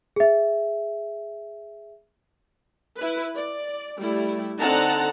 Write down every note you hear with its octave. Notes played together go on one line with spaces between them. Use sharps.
G#4 E5
E4 B4
D5
G3 A3 E4
D3 C4 D#4 F#5 A5 A#5